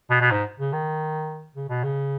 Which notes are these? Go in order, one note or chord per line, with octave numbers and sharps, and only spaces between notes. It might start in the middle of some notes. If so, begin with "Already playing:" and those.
B2
B2
G#2
C#3
D#3
C#3
B2
C#3